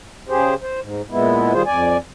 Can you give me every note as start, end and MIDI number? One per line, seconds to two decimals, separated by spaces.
0.29 0.55 49
0.29 0.55 67
0.29 0.55 68
0.29 0.55 72
0.62 0.80 72
0.82 1.02 44
1.11 1.53 46
1.11 1.53 56
1.11 1.53 59
1.11 1.53 64
1.53 1.62 51
1.53 1.62 55
1.53 1.62 65
1.53 1.62 68
1.53 1.62 72
1.66 1.97 41
1.66 1.97 74
1.66 1.97 80